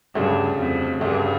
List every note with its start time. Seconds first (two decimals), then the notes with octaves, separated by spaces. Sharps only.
0.15 D2 G2 C#3 G3
0.58 F2
1.01 D2 G2 C#3 G3